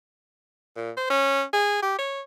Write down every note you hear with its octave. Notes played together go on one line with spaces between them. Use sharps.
A#2
C5
C#4
G#4
G4
C#5